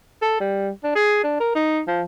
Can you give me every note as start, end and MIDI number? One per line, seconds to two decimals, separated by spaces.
0.22 0.40 69
0.40 0.70 55
0.84 0.91 62
0.95 1.20 68
1.24 1.39 62
1.41 1.51 70
1.55 1.81 63
1.87 2.03 53